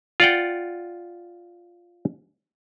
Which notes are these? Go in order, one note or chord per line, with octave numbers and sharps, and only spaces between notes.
F4 D5 F#5 G5